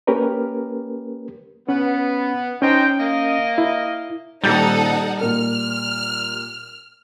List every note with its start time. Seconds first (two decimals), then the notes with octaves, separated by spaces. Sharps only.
0.07 A#3 C#4 G4 A#4 B4
1.69 B3 C#4
2.62 C#4 D#4 C5 G5
2.99 A#3 D#5
3.58 E4
4.44 D#1 G3 D#4 A4 F#5 G6 A6
5.21 A#2 A#4 F6